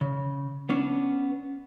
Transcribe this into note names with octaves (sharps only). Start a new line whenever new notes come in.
C#3
B3 C#4 D4